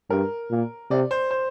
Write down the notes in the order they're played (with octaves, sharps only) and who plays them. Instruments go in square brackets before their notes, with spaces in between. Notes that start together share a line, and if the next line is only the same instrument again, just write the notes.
[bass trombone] G2 [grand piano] A#4
[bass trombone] A#2
[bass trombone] C3 [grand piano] D5
[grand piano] C5
C5